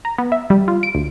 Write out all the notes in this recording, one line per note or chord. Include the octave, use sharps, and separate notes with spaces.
A#5
B3
E5
G3
F4
D7
D2